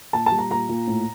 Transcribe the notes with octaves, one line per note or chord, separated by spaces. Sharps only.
A#2 A5
A5
G3
A#5
A#2 A#5
A#2
A2